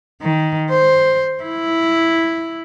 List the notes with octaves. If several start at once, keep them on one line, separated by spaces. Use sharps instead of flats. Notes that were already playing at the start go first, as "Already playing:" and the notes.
D#3
C5
E4